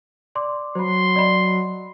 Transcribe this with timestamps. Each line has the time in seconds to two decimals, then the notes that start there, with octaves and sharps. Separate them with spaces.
0.35 D5 C6 D6
0.75 F#3 C5 B5 C6
1.16 D5 D#5 B5